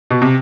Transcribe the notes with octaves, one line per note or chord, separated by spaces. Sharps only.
B2
C3